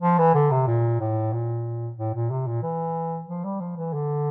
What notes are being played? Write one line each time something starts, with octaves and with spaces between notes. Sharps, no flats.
F3
E3
D3
C3
A#2
A2
A#2
A2
A#2
C3
A#2
E3
F3
G3
F3
E3
D3